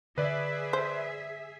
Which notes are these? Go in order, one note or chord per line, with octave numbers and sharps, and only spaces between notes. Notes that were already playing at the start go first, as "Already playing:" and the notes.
D3 G#4 B4 D5 E5
C5